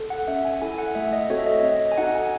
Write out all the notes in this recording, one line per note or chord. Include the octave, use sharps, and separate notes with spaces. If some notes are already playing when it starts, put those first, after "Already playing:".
Already playing: A4
F#5
C#4 E5
G#5
E4 A4 G#5
F#5
A3 E5
D#5
C4 F#4 A4 C#5
E5
D#5
C4 D#5
D#5
G#5
D#4 F#4 A4 F#5
G#5